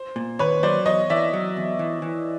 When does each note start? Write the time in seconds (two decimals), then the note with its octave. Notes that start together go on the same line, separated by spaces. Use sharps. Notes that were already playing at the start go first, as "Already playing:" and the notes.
Already playing: C5
0.16 A#2
0.39 D#2 B4 C#5
0.63 F#3 C5 D5
0.86 E2 C#5 D#5
1.10 E3 D5 E5
1.33 F#3
1.57 E2
1.79 E3
2.02 E3